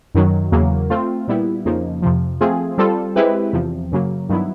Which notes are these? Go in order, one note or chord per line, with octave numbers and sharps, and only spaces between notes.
F#2 D#3 F#3
E2 C#3 F#3 A#3
A3 C4 F4
A#2 G3 B3 E4
F2 C#3 F3 A#3 D#4
F2 C3 F3
F3 A3 C4 F4 G#4
G3 C4 F4 A4
G#3 C4 E4 G4 B4
E2 C3 F3
F#2 C#3 F#3 A#3
G2 D#3 F#3 B3 E4